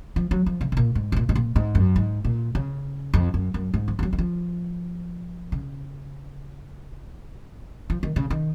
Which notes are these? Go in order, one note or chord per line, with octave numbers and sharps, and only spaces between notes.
F3
F#3
F3
C#3
C3
A#2
G#2
C3
A#2
G#2
A#2
G#2
F#2
G#2
A#2
C#3
F2
F#2
F#2
G#2
F3
F3
F#3
D#3
F3
C#3
F3
D#3
C#3
D#3